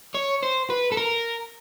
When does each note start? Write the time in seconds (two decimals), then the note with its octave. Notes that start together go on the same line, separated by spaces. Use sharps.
0.15 C#5
0.43 C5
0.70 B4
0.92 A4
0.97 A#4